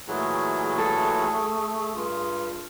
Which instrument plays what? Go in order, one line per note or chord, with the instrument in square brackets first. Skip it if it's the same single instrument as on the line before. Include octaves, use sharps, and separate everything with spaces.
[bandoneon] A#2 E3 F#3 [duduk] A3 [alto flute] G#4
[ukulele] A4
[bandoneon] G2 [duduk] F4